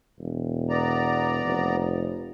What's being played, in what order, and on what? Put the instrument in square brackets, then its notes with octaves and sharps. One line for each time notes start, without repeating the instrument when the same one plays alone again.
[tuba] E1
[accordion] B3 D5 A#5
[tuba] F1